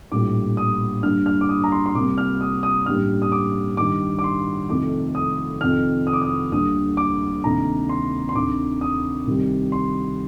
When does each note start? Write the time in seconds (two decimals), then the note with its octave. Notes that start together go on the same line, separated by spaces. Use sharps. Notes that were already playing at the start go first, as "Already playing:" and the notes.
0.12 A#1 A2 G3 A#3 D6
0.57 D#6
1.03 G2 D3 G3 A#3 F6
1.26 F6
1.41 D6
1.49 D#6
1.64 A#5
1.72 C6
1.86 C6
1.95 C2 C3 G3 A#3 D6
2.18 F6
2.41 D#6
2.63 D#6
2.86 A1 G2 D3 G3 A#3 F6
3.22 D#6
3.32 D6
3.77 G2 D#3 G3 D6
4.19 D6
4.24 C6
4.69 F2 C3 D#3 A3 D6
5.15 D#6
5.61 F2 C3 D#3 F6
6.07 D#6
6.13 D6
6.22 D#6
6.52 D2 D3 G3 A#3 D#6
6.97 D6
7.43 D2 C3 D#3 A#3 A#5
7.89 C6
8.29 C6
8.35 D2 C3 D#3 D6
8.81 D#6
9.26 C2 C3 D#3 G3
9.72 C6